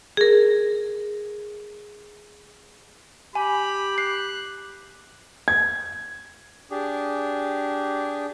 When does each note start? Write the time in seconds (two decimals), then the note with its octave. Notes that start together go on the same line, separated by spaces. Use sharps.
0.17 G#4 A#4
3.35 G4 G#5 B5
3.98 F#6 C7
5.48 G#6
6.71 D4 G4 G#4